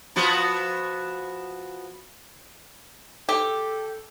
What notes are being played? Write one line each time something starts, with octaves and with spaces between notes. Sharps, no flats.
F3 B3 F#4
G4 A4